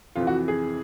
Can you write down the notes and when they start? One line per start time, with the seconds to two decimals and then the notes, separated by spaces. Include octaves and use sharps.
0.15 F2 C3 E3 F4
0.27 F#4
0.48 G#4